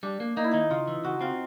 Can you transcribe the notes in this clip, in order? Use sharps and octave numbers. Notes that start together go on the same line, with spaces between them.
G3 D4
A#3
A#3 D#4
E4
D#3 D#4
C#3 F4
E3
C#3 F#4
C4 F4